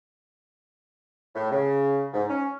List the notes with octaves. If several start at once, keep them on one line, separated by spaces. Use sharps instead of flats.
A2
C#3
G#2
C#4